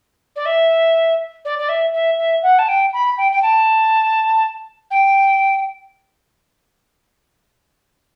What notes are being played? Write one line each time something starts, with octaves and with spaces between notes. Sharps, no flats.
D5
E5
D5
D5
E5
E5
E5
F#5
A5
G5
B5
G5
G5
A5
G5